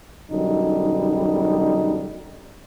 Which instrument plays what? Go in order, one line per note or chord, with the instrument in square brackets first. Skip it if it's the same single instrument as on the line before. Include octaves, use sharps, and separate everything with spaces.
[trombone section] B1 F#2 D3 G3 D#4